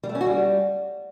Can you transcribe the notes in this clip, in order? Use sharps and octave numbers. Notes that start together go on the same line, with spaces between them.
G3
A3
C#4
F#4
G3